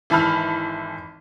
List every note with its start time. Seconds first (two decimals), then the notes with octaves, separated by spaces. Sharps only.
0.10 G#1 E3 A5 B5 F6